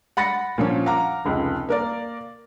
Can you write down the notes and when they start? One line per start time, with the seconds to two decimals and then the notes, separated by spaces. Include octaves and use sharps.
0.17 F#5 B5 A6 A#6 C#7
0.58 A#2 F3 C#4
0.86 F5 F#5 A#5 D6
1.25 F1 C#2
1.69 A#3 A#4 D5